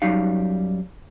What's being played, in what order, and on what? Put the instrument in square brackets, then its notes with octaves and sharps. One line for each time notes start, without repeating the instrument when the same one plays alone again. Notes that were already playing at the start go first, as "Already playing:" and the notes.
[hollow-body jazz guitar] F#2 G3 D#4 F5